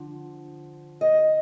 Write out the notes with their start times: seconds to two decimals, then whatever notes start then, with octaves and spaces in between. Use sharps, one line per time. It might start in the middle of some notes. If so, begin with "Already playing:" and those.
Already playing: D3 F3
1.01 D#5